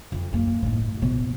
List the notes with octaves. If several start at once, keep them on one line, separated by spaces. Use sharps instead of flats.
F2 D#4
F#2 A#3
A2 D#4
B2 F3